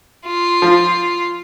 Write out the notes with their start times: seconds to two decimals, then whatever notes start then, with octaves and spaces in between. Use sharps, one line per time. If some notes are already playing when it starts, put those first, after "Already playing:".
0.25 F4
0.62 F3